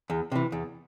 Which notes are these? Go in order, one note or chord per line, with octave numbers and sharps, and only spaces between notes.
E2
C3 E3
E2